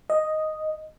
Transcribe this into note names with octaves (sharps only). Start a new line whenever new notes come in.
D#5